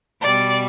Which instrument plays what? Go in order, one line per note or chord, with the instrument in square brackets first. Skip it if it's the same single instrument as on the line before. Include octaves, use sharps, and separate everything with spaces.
[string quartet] B2 G3 D5